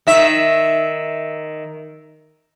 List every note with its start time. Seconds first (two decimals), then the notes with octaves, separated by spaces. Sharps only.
0.07 D#3 E5